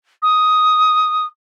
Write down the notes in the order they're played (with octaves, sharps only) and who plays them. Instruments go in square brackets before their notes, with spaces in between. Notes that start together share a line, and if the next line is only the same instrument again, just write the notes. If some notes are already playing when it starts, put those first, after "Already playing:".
[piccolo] D#6